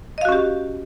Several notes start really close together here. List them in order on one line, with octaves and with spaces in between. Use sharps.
D#5 F5 F#4 C#4 G4